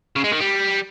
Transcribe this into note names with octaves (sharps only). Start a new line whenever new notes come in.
C#3
G#3
D#3
G3